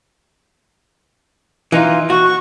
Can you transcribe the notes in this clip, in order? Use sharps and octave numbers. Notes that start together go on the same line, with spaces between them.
E3 D#4 F4
F#4 C#6